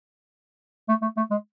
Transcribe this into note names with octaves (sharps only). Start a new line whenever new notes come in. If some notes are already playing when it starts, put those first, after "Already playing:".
A3
A3
A3
G#3